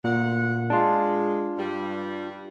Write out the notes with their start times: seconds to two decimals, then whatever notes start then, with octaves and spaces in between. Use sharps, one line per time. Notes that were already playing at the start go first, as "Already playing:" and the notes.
0.04 D2 A#2 A#4 F#5
0.70 G#3 D4 F4
1.58 G2 G3